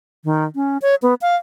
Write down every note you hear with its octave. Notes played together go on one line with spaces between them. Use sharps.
D#3
C#4
C#5
B3
F5